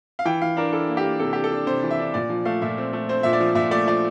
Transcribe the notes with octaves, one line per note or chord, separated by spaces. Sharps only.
F5
E3 G5
E3 F5
D4 A#4
E3 A4
A#3
G4
A#3
C3 A4
D4 G4
A4
D4
C3 C5
E3
E5
D4
A#2 D5
F3
A3 F5
A#2 E5
C4
A3
C4 C5
A#2 E5
D5
F3
A#2 E5
A3 D5
F3 D5